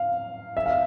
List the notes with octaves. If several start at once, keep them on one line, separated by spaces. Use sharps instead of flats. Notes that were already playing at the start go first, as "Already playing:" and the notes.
Already playing: F5
E5
F5